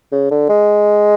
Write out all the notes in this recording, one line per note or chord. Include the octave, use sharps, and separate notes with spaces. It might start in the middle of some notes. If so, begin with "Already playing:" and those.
C#3
D3
G#3